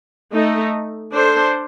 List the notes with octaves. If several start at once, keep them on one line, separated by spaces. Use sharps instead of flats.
A3 D#4 A4
D4 A4 C5